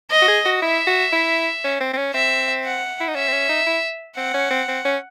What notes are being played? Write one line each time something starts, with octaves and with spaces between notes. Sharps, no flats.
D#5
F#4
G#4
F#4
E4 E5
F#4
E4
C#4
C4
C4
C#4
C4 E5
F#5
E4
D#4
C#4 E5
C4
C#4
D#4
E4
C4 F#5
C#4
C4
C4
C#4